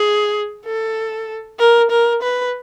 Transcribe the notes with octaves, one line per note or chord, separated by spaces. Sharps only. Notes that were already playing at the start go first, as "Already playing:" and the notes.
Already playing: G#4
A4
A#4
A#4
B4